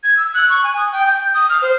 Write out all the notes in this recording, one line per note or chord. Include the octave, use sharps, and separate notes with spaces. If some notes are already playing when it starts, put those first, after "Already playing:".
G#6
E6
F#6
C#6
G#5
D#6
G5
G6
D#6
F6
C5